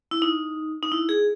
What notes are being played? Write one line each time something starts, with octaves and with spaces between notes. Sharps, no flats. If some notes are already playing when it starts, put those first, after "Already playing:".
E4
D#4
D#4
E4
G#4